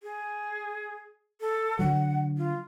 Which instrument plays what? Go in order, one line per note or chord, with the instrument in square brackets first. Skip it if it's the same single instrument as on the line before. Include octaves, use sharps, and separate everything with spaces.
[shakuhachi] G#4
A4
[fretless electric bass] D3 F#3 [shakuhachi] F#5
[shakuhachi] F4